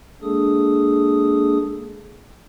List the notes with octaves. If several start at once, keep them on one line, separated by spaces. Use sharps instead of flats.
G#3 A#3 D4 G#4 A4 D#6